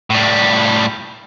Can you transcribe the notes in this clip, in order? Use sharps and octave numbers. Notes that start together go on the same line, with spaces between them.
A2 G3